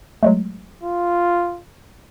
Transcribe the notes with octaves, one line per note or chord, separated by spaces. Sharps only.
F#3 G#3 A3
F4